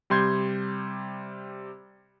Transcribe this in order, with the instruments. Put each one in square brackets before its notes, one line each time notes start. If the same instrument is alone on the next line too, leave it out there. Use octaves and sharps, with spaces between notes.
[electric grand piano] C3 G3 C6 G6 G#6